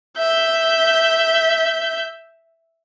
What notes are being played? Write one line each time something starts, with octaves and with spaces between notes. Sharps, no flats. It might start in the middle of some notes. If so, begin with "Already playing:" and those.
E5 G6